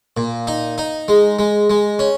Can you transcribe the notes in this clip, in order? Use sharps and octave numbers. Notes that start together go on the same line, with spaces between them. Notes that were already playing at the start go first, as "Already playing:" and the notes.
A#2
D#4
D#4
G#3
G#3
G#3
C#4